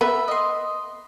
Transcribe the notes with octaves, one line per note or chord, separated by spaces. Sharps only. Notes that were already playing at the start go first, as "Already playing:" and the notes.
B3 E5
D#5 C6